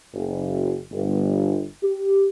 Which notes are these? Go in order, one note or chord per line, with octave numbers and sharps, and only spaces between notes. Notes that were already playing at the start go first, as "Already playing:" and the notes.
F#1
G1
G4